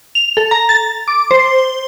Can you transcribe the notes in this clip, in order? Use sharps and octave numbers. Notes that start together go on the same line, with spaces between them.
F7
A4
A#5
A6
D6
C5